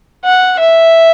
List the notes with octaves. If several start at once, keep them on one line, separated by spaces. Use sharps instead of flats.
F#5
E5